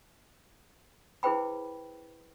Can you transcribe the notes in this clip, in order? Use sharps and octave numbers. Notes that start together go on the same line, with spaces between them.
E4 G#4 B4 C5 G5 B5